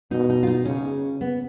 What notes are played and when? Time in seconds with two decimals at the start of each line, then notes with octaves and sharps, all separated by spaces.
0.11 B2 D#4
0.30 D#4
0.43 F4
0.47 D#4
0.65 C#3 C#4
1.21 B3